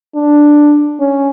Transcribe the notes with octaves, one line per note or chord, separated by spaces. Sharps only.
D4
C#4